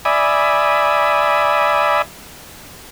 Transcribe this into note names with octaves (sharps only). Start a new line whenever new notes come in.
D5 E5 G#5 B5 D#6